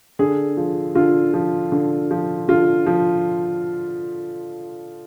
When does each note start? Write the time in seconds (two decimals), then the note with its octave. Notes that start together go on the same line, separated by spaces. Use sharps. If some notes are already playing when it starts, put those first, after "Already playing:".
0.19 D3 G#4
0.57 F3
0.95 D3 F4
1.34 F3
1.72 D3
2.11 F3
2.49 D3 F4
2.86 F3